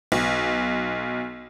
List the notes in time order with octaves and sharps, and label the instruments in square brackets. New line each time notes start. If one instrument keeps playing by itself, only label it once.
[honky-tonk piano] B1